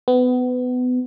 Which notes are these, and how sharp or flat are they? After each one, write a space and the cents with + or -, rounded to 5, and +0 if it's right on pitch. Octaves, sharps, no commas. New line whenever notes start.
B3 +25